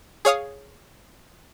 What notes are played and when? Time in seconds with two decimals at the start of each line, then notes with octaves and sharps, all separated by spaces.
0.25 G#4 C#5 F5 D#6